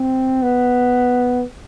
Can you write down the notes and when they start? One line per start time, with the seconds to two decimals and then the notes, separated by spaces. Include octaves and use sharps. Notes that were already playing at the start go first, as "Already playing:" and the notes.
Already playing: C4
0.42 B3